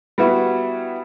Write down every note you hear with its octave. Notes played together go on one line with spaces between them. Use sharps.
G3 B3 E4 F#4